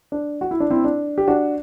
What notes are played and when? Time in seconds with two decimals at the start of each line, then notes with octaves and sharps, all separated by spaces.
0.12 D4
0.41 F#4
0.51 E4
0.60 D4
0.70 C4 E4
0.84 D4
1.18 G4
1.28 D4 F#4